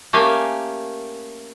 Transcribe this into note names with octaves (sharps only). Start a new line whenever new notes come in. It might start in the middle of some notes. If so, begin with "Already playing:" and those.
A3 A#3 C#4 G4 F5 G#5